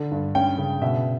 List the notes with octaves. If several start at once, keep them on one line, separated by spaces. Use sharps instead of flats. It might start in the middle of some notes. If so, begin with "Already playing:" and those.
Already playing: D3
G2
C#4 G5
C#3
B2 E5